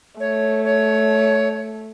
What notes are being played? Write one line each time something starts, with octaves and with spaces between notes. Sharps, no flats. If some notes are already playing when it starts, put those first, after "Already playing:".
A3 C#5
C#5